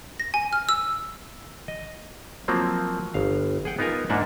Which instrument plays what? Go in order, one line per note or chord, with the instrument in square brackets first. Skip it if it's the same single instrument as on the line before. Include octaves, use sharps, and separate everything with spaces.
[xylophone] A#6
G#5
F6
E6
[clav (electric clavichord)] D#5
F3 F#3 A#3 C4
G1 F5
G#4 F#5 G5
B3 D#4 F4 A#4 G#5
G#2 A#3 D4 E5 F#5